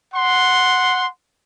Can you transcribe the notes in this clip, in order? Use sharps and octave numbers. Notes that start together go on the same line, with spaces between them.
F#5 C6